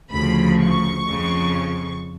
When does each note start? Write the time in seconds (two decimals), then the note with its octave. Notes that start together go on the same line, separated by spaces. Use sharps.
0.12 D2 C#3 F3 B5
0.60 C#6
1.08 F2 C#3 F3